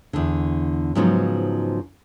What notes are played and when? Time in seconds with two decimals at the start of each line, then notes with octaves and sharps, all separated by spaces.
0.13 E2 D3
0.95 G#2 C#3 F3 F#3 B3 D#4